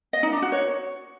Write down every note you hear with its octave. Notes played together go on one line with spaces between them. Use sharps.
D#5
D#4
D4
F#4
C#5